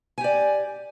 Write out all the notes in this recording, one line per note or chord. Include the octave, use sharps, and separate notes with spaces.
G4 D5 G#5